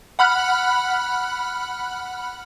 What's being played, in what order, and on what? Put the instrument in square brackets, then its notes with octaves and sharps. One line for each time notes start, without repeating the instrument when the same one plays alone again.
[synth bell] F#5 B5 F6 F#6